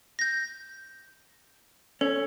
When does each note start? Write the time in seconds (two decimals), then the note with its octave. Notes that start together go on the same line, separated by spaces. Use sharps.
0.19 G6 A#6
2.01 C#4 A4